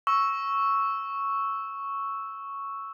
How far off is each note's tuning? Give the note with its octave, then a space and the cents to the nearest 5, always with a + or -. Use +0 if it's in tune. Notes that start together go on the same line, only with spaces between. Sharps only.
C#6 +0 E6 +0